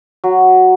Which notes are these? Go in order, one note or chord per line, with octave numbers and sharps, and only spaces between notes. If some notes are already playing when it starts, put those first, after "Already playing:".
F#3